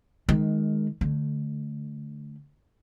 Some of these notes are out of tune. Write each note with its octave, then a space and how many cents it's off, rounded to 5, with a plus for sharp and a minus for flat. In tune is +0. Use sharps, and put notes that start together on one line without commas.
D#3 +0 G#3 +15
D3 +0 A3 -15